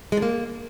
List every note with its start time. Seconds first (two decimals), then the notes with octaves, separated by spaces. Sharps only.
0.12 G#3
0.17 D3
0.22 A#3